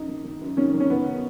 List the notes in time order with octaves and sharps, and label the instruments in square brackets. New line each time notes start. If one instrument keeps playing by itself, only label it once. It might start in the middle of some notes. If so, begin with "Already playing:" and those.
Already playing: [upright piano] F#2 D#4
D#3
D#3
F#2
D#3 C#4
D#3
C#4
D#3 B3